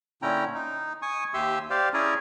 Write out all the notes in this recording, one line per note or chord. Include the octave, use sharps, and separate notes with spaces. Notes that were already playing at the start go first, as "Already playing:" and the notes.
A#2 D3 C#4 E4 G5 A#5
D#4
G#5 C#6 D#6
D#2 G4 E5 C6 E6
G4 C5 D5 F5
C#4 E4 G#4 D5 G#5 A#5